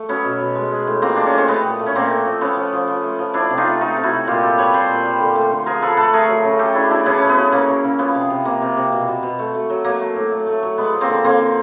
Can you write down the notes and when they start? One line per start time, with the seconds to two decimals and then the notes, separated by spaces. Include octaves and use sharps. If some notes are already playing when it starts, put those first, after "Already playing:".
Already playing: A3
0.09 F#3 B3 C#4
0.25 B2
0.41 B2
0.55 G#3
0.71 G#3
0.87 A2
1.02 F3 A#3 C4
1.16 G#3 D4
1.26 C#4
1.33 A2 C4
1.48 A3 B3
1.63 A#2
1.79 A3
1.86 C#4
1.95 A#2 A#3 C4
2.10 A3
2.26 F3
2.41 F3 B3 C#4
2.57 F3
2.73 F3
2.88 F3
3.03 A3
3.19 F3
3.34 F3 D4 E4
3.50 C3
3.57 D#4 F4
3.66 A3
3.81 A3 D#4 F4
3.97 C3
4.04 E4 F#4
4.12 C3
4.27 A#2 F4 G4
4.43 G3 G4 A4
4.58 G3 B4 C#5
4.73 G3 C5 D5
4.89 A#2
5.05 G3
5.20 D3
5.36 A3
5.51 D3
5.66 F3 G#4 A#4
5.82 F3 A4 B4
5.97 A3 A4 B4
6.13 A3 G#4 A#4
6.28 F#3
6.44 C#3
6.59 A3 G4 A4
6.75 C#3 D4 E4
6.91 F#3 D4 E4
7.06 C#3 B3 C#4
7.22 C#3
7.29 B3
7.37 F#3
7.52 C#3 A#3
7.68 C#3
7.84 C#3
7.99 F3 B3
8.15 C3
8.30 C3
8.45 C3 A#3
8.62 C3
8.77 C3
8.92 B2
9.08 B2
9.23 B2
9.39 A3
9.55 A3
9.70 F#3
9.85 F#3 A#3
10.01 A3
10.16 A2
10.32 A3
10.47 A3
10.63 F#3
10.78 G#3 B3
10.93 F3
11.01 A#3 C4
11.09 D3
11.24 D3 A#3 C4
11.40 D3